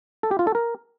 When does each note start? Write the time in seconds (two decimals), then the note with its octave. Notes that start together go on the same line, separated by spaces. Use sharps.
0.23 A4
0.31 G4
0.39 F4
0.47 A4
0.55 A#4